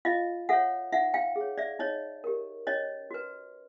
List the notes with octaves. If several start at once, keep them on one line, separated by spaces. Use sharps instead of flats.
F4 D#5 F5
A4 C#5 E5 F#5
D#4 E5 F#5
F5 G5
G#4
C#5
D5 E5
D#4 C#5 D#5
G4 A#4
C#4 C#5 D#5
F#4 B4